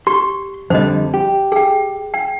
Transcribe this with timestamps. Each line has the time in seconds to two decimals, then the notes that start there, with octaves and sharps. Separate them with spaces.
0.07 G4 C6
0.70 F2 D3 G3 C5 D#5
1.14 G4
1.52 G#4 G5
2.14 G5